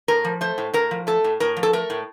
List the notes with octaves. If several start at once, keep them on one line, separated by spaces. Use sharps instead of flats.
A2 A#4
F3
A3 C5
A2
A2 A#4
F3
A3 A4
A2
A2 A#4
F3
A4
A3 A#4
A2